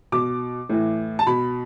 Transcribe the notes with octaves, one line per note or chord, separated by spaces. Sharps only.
B2 D6
A2 E3
A5
B2 B5